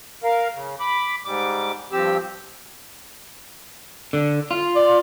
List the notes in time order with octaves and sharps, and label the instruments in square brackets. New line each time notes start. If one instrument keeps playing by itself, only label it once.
[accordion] A#4 F5
C#3
B5 D6
G#2 G3 D6
G2 F3 C4 G4 E6
[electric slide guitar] D3
F4
[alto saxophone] D5